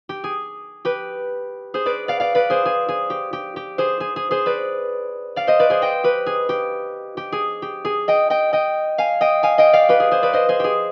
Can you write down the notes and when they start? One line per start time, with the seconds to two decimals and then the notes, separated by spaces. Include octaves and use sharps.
0.09 G4
0.24 G#4
0.85 G4 B4
1.74 G#4 C5
1.86 B4 D5
2.08 D5 F5
2.20 D5 F5
2.35 B4 D5
2.50 G#4 C5
2.65 G#4
2.89 G#4
3.10 G4
3.33 G4
3.56 G4
3.78 G#4 C5
4.00 G#4
4.16 G#4
4.31 G#4 C5
4.46 B4 D5
5.36 D5 F5
5.47 C5 D#5
5.59 B4 D5
5.70 G#4 C5
5.82 D#5 G5
6.04 G4 B4
6.26 G#4
6.49 G4
7.17 G4
7.32 G#4
7.62 G4
7.85 G#4
8.08 D#5 G5
8.30 D#5 G5
8.53 D#5 G5
8.98 F5 G#5
9.21 D#5 G5
9.43 F5 G#5
9.58 D#5 G5
9.73 D5 F5
9.89 G4 B4
10.00 G#4
10.11 G#4 C5
10.22 B4 D5
10.33 C5 D#5
10.49 G#4 C5
10.60 G4 G#4